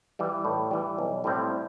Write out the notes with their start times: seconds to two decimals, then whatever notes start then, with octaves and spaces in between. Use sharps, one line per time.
0.19 E3 G3
0.45 A2
0.71 E3 G3
0.99 B1
1.24 A2 G3 C4 E4